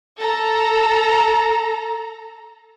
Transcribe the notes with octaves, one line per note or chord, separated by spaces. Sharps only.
A4 A#5